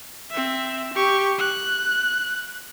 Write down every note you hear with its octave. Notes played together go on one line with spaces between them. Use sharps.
C4 E5
G4 C#6
F#6